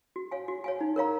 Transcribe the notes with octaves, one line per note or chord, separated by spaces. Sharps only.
F#4
C#5 F5 G#5
F#4
C#5 F5 G#5
D#4
A#4 C#5 F5 A#5